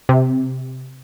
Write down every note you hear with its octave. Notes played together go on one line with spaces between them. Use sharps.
C3